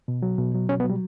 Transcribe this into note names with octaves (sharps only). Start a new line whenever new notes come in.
B2
F#3
B2
F#3
B2 C#4
B3
F#3
G3